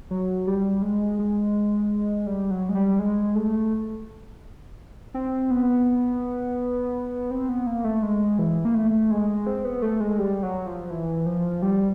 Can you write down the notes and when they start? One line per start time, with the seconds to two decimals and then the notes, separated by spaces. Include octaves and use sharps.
0.11 F#3
0.47 G3
0.82 G#3
1.19 G#3
2.26 G3
2.51 F#3
2.69 G#3
2.75 G3
2.99 G#3
3.35 A3
5.14 C4
5.51 B3
7.31 C4
7.49 B3
7.67 A#3
7.84 A3
8.03 G#3
8.39 E3
8.65 A#3
8.75 A3
9.11 G#3
9.46 C4
9.65 B3
9.82 A3
10.00 G#3
10.18 G3
10.43 F#3
10.66 F3
10.91 E3
11.26 F3
11.62 G3